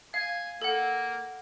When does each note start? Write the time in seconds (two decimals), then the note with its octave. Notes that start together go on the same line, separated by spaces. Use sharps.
0.14 F5 G#5
0.62 A#3 A4 F#5